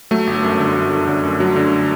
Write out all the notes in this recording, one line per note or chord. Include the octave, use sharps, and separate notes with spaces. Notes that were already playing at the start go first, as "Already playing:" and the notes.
F#3 A3
G1
F#2
D3
F#2
D3
D3
F#2
F#3
D3